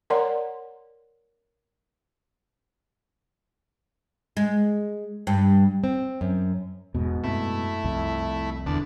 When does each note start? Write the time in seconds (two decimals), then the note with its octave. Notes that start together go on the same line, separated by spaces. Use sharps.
0.10 A#4 C#5 D5 F#5 A#5 C6
4.37 G#3
5.27 G2
5.84 C4
6.21 F#2
6.94 E1 G#2 B2
7.24 F#2 A3 C4 E4
7.84 C2 F2
8.66 D#1 E2 D3 D4